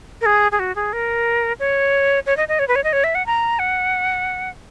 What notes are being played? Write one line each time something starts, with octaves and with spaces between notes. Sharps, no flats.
A#4
G#4
G#4
F#4
G#4
A#4
C#5
C#5
D#5
D#5
C#5
B4
C#5
D#5
C#5
E5
F#5
A#5
F#5